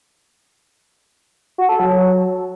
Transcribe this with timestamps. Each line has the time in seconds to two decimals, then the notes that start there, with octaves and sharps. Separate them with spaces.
1.58 F#4
1.69 A4
1.79 F#3